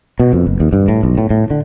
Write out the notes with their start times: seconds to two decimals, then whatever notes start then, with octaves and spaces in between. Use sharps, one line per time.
0.20 B2
0.33 F2
0.47 F#1
0.60 D#2
0.73 G2
0.88 A2
1.03 B1
1.18 A2
1.30 A2
1.50 D3